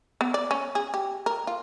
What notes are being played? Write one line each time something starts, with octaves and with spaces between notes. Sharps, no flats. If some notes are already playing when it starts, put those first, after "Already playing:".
B3
D5
C#4
G#4
G4
A#4
F4